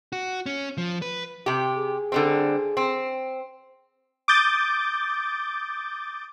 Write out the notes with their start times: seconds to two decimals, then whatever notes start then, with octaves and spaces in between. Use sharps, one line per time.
0.13 F#4
0.46 C#4
0.78 F3
1.02 B4
1.46 C3 G4
1.78 G#4
2.12 D3 G3 C4
2.77 C4
4.28 D6 D#6 G6 A6